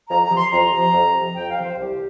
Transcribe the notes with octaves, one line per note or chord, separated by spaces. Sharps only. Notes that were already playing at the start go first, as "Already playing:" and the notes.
F2 A#5
A#5
C3 F3
C6
F2 A#5
C3 F3
F2
C3 F3
F2 G5
F5
C3 F3
C5
C2 G4